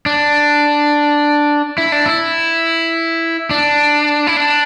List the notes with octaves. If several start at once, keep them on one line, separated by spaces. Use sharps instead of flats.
D4
E4
D4
E4
D4
E4
D4